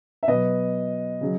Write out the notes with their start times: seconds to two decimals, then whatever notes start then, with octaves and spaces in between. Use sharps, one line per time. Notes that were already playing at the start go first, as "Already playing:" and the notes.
0.23 E5
0.28 B2 F#3 B4 D#5
1.21 C#3 F#3